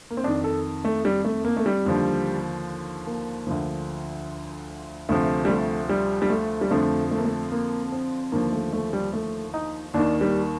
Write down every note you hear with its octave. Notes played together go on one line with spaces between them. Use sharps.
A#3
C4
F2 D#3 D4
A4
A3
G3
A3
A#3
A3
G3
D#2 D3 F3
A#3
D2 D3 F3
D2 C3 F3 A3
G3
A3
G3
G3
A3
G3
F2 D3 F3 A3
A3
A#3
A3
A#3
C4
D#2 D3 F3 A#3
A3
A3
G3
A3
D#4
D#2 D#3 D4
G3